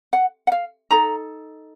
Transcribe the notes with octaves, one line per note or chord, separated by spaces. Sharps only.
F#5
F#5
F5
D#4 A4 A#5